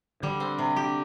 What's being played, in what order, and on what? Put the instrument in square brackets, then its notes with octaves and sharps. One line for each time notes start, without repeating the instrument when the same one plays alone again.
[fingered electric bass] D3 [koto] G3
[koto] C4
C3
G4